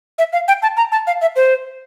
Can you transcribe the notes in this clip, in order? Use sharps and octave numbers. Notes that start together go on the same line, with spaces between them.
E5
F5
G5
A5
A#5
A5
F5
E5
C5